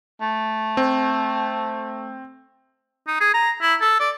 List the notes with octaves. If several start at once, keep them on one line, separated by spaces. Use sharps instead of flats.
A3
C4
D#4
G#4
A#5
E4
A4
D5